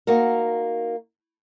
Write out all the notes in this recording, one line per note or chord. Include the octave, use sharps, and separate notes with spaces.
A#3 D#4 F#4 A#4